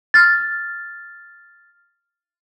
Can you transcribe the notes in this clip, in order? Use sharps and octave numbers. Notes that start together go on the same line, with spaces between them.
F6 A6